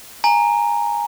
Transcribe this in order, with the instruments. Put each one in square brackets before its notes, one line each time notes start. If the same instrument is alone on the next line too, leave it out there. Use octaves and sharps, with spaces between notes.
[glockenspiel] G#5 A#5